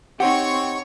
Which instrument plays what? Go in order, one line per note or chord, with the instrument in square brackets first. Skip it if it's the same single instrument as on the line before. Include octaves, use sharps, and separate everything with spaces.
[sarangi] C4 [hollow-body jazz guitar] D#4 G4 [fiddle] C#5 C#6 [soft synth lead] F#5